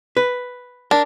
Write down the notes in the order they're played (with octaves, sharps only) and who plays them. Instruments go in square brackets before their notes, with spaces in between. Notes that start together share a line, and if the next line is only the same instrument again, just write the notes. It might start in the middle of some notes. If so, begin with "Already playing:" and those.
[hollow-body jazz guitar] B4
[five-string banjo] D4 [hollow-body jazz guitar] A#4